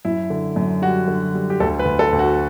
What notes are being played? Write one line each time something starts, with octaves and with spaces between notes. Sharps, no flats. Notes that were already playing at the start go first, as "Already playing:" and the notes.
F#2 E4
D3
F#2
G3 F#4
D3
G3
G4
D2 A4
B4
D2
A4
D2
F#4